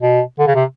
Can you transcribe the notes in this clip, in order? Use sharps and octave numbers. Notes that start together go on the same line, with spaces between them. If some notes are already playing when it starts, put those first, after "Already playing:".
B2
D3
C#3
C3